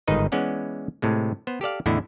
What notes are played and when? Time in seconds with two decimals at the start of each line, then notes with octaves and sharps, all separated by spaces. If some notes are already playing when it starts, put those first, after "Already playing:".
0.08 G1 G#2 D#3 D#4 B4 D#5
0.32 E3 G#3 B3 C#4 D5 F#5
1.02 A2 C3 G#3
1.47 B3 C5
1.61 G4 A4 D5 F5
1.86 E2 A2 D3 E4 D#5